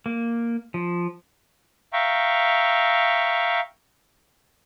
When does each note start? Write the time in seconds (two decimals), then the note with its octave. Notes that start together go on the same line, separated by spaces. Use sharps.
0.06 A#3
0.74 F3
1.93 E5 F5 G5 A#5 C#6